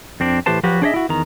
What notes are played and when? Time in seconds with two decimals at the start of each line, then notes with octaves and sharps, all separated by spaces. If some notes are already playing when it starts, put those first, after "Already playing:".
0.20 F2 C4 D4
0.46 A2 E3 G4 B4 C5 A5
0.63 F3 F#3 F#4 G4 B4
0.82 D4 G#4 C5 C#5 D#5 E5
0.94 E4 F#4
1.09 E2 D#3 A#5